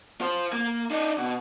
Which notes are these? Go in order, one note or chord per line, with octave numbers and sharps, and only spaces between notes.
F4 C5
A#3
D4 D#4
B2